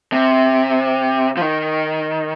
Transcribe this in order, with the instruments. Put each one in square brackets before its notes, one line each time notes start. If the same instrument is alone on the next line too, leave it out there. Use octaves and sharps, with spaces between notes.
[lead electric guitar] C3
F3
D#3